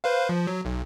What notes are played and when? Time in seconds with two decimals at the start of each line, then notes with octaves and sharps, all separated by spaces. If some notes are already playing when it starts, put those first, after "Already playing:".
0.04 B4 C5 F5
0.29 F3
0.47 F#3
0.65 B1